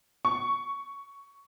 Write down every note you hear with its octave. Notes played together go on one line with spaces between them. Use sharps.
C#6